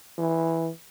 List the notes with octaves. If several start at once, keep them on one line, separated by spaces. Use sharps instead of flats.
E3